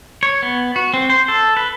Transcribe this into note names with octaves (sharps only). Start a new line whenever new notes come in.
C#5
B3
F#4
C4
C5
A4
B4